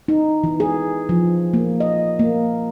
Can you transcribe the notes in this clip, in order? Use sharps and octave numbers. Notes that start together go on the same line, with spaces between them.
D#4
E3
G#4
F3
A#3
D#5
A#3